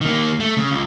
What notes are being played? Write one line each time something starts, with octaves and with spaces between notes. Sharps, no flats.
D#3 A#3
A3
C#3
C#2